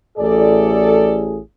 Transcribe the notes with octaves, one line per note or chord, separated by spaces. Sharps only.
A1 A2 G#4 A4 D5